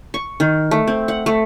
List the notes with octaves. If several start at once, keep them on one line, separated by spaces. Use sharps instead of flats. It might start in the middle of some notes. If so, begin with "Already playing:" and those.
C#6
D#3
A3
C4
F#5
A3